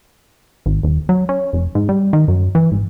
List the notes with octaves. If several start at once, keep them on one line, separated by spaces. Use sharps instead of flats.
G#1
D#1
F#3
C#4
F1
G#2
G3
D#3
F#2
E3
G#1